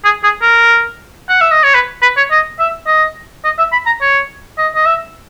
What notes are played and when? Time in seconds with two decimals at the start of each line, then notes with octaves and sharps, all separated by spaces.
0.05 G#4
0.24 G#4
0.42 A#4
1.29 F#5
1.41 E5
1.51 D#5
1.64 C#5
1.75 B4
2.02 B4
2.17 C#5
2.31 D#5
2.59 E5
2.87 D#5
3.45 D#5
3.58 E5
3.72 B5
3.86 A#5
4.01 C#5
4.58 D#5
4.76 D#5
4.86 E5